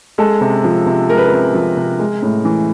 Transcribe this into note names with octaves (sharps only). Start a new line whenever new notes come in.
G#3 A4
C3
F3
C3
G#3 A#4
B4
A#4
C3
F3
C3
G#3
A2
E3